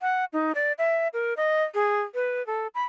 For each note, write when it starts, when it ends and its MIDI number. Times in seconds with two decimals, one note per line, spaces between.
0.01 0.25 78
0.33 0.52 63
0.55 0.73 74
0.78 1.08 76
1.13 1.34 70
1.37 1.64 75
1.74 2.01 68
2.15 2.45 71
2.47 2.67 69
2.75 2.84 83